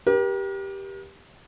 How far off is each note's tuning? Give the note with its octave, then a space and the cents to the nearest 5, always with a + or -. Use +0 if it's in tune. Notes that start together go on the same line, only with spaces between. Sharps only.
G4 +0 A#4 +40